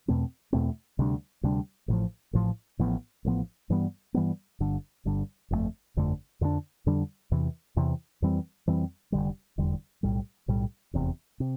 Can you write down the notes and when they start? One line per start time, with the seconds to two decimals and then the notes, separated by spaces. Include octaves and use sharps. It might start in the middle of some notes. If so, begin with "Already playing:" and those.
0.08 E2 B2 A3 C4
0.53 E2 B2 A3 C4
0.99 D2 C3 G3 D4
1.43 D2 C3 G3 D4
1.88 A1 A2 F3
2.33 A1 A2 F3
2.79 A1 A2 F3 B3
3.25 A1 A2 F3 B3
3.70 G2 E3 G3 B3
4.14 G2 E3 G3 B3
4.60 G1 G2 D3
5.05 G1 G2 D3
5.51 G1 F2 D3 A3
5.96 G1 F2 D3 A3
6.41 F2 D3 G3 D4
6.86 F2 D3 G3 D4
7.31 E2 C3 E3
7.77 E2 C3 E3
8.22 F2 E3 G3 C4
8.68 F2 E3 G3 C4
9.12 F1 E2 D3 G3
9.58 F1 E2 D3 G3
10.03 B1 A2 G3
10.48 B1 A2 G3
10.93 F1 E2 C3
11.40 C3